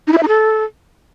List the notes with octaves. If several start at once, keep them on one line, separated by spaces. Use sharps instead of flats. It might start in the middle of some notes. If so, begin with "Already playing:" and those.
D#4
E4
E5
D#4
A4